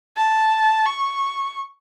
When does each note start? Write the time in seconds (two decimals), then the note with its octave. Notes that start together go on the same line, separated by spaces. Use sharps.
0.17 A5
0.86 C#6